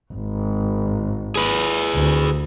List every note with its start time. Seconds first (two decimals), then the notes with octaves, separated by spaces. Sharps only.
0.13 G#1
1.36 G#4 B4
1.95 D2